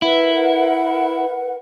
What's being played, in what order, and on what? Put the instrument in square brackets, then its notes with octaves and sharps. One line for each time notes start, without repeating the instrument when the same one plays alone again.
[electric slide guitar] E4 [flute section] A#4 B4 F#5